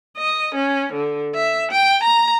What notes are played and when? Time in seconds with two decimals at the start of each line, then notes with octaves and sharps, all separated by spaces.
0.18 D#5
0.55 C#4
0.93 D3
1.35 E5
1.71 G5
2.03 A#5